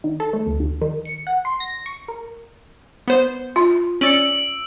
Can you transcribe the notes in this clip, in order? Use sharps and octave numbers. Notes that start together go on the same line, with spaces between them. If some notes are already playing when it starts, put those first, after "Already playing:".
D#3
A4
A3
D2
D#2
D#3
C#7
F#5
C6
A#6
C#6
A#4
B3 C5
F4
C#4 D5 E6 C#7 D7 F#7